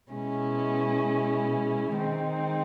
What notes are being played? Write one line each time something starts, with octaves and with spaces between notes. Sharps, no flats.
B2 G#3 C#4 E4
D#3 G#3 C4 D#4